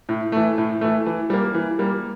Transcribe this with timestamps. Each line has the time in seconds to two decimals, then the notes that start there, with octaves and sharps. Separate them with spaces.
0.09 A2
0.32 E3 A3
0.58 A2
0.81 E3 A3
1.06 E3
1.30 G3 A#3
1.54 E3
1.79 G3 A#3